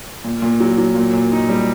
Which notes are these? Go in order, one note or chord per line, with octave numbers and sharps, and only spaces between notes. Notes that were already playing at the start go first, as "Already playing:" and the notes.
A#2
A#2
F#3
F#3
A#2
A#2
D#4
G3